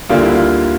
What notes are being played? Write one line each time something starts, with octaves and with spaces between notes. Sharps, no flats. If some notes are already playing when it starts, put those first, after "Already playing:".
D2 D3 G3 A#3 F4
E4
F4